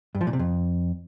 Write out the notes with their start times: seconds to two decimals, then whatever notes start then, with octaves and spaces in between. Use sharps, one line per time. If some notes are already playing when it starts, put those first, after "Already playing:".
0.15 G2
0.21 F3
0.27 A#2
0.33 C3
0.39 F2